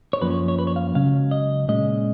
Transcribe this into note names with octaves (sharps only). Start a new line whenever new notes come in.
C#5
F#2 F3 A#3 C#4 B4
C#5
C#5
B4
C#5
F5
C#2 C#3 F#3 C#4 F5
D#5
A#2 G#3 C#4 D#5